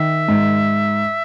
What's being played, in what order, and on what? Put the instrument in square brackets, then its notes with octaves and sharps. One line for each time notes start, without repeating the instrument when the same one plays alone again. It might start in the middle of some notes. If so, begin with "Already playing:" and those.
Already playing: [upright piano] D#3 [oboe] E5
[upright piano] G#2